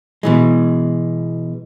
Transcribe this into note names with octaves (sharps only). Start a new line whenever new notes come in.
B2 E3 G#3